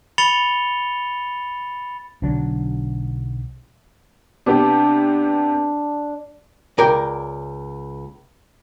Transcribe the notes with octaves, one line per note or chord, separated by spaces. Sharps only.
B5 A6 C#7 F7 G7
B1 D3 F#3 D4
C3 B3 D4 G4 A5
C#2 A#4 D5 G5